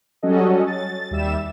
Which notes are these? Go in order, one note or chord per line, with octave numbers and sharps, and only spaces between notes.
F#3 G3 C#4 F#4 A4 D#5
A6
D#2 G3 E5 E7